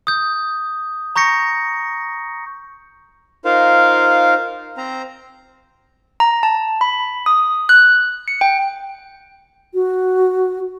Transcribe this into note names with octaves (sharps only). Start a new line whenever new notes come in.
D#6 G6
A#5 C#6 G6 A#6 C#7
D#4 F4 A#4 C5 F5
C4 C5 A#5
A#5
A5
B5
D#6
F#6
C#7
G5
F#4